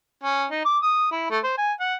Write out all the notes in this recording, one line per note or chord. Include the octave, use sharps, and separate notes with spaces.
C#4
D#4
D6
D#6
E4
A3
C5
G#5
F#5